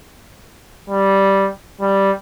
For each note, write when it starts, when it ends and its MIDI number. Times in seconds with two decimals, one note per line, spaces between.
0.90 1.49 55
1.81 2.11 55